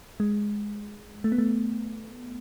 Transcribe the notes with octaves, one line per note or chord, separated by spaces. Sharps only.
G#3
A3
B3
A3